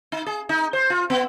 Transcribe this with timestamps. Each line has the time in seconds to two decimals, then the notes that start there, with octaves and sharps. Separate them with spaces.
0.12 D#4
0.26 G#4
0.49 D#4
0.73 C5
0.90 F4
1.10 B3